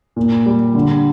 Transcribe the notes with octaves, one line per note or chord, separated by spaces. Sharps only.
A#2
G3
D3